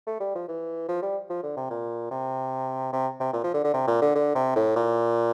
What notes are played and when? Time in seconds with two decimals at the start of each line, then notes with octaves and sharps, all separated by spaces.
0.07 A3
0.20 G3
0.35 F3
0.48 E3
0.89 F3
1.02 G3
1.30 F3
1.43 D3
1.57 C3
1.70 A#2
2.11 C3
2.93 C3
3.20 C3
3.33 A#2
3.44 F3
3.54 D3
3.64 D3
3.74 C3
3.88 A#2
4.02 D3
4.15 D3
4.35 C3
4.56 A2
4.76 A#2